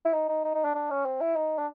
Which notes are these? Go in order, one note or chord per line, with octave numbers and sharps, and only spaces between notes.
E4
D#4
D#4
D#4
D#4
D4
D4
C#4
C4
E4
D#4
D4